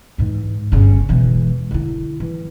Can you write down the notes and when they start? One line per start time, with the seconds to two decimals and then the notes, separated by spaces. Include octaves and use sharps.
0.18 G#2 E3
0.72 G1 C#3
1.09 E1 E3
1.71 D3 E4
2.20 E3